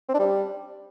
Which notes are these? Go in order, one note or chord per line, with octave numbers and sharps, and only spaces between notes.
C4
D4
G3